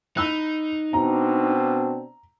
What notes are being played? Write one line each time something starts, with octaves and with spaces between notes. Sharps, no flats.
D#4 B5 E6 F#6
B2 C4 D4 A#5